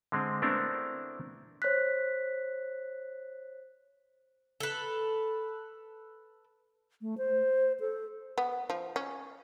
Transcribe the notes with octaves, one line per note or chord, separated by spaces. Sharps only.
D3 G#3 C4
A3 B3 C4 D4 E4 A#4
C5 C#5 F#6 B6
A4 B4
A3
C5
A4
B3
F3
C#4